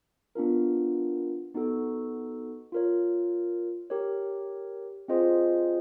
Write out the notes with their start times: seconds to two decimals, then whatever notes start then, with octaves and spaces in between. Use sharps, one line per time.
0.35 B3 D4 F4 A#4
1.54 B3 D#4 F#4 A4
2.72 F4 A#4 C#5
3.90 G4 A#4 C#5
5.08 C4 F4 G#4 C5 D#5